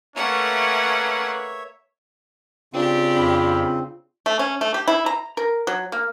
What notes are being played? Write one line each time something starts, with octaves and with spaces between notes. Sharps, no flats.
A3 A#3 C#4 B4 C#5 E5 F#5
C#3 C4 D4 F4 G4
F2 B5
A3
C#4
A3
G4
E4
A#5
A#4
F#3
A#3